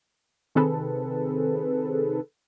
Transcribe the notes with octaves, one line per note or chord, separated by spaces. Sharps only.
C3 D#3 C4 G#4 A4 B4